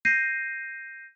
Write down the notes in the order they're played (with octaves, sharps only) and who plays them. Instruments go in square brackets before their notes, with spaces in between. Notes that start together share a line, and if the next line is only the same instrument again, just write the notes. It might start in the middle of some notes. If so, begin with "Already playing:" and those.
[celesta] G6 A#6 C7 D#7